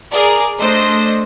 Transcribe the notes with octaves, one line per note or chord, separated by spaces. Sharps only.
G#4 A#4 D5
A3 D4 C5 D#5